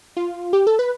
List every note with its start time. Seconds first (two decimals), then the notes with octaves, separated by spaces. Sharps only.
0.17 F4
0.53 G4
0.67 A4
0.79 B4